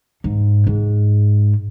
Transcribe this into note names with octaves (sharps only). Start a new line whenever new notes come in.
G#2
G#2